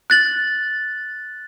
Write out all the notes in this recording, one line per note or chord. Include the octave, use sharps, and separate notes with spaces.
F#6 A6 F#7